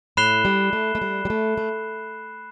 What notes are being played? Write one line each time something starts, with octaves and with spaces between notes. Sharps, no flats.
A2 B5 F#6 C7 E7 G7
G3
A3
A3
G3
G3
A3
A3